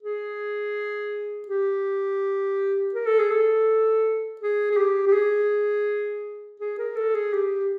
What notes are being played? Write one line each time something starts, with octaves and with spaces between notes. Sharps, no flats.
G#4
G4
A#4
A4
G#4
A4
G#4
G#4
G4
G4
G#4
G#4
A#4
A4
G#4
G4